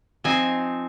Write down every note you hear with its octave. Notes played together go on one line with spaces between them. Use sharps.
F3 C4 D#4 G#5